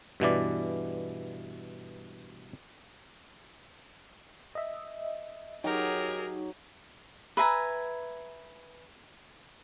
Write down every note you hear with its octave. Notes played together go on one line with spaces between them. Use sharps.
G2 B2 E3 D5
D#5 E5
F#3 D#4 G4 G#4 A#4
B4 E5 G#5 A#5